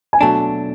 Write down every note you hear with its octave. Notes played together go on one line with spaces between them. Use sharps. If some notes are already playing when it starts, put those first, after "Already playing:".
G#5
B2 F#3 A3 D4 A5